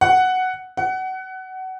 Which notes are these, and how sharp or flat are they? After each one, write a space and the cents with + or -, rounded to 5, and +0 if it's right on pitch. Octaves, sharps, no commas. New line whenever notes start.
F#5 +5
F#5 +25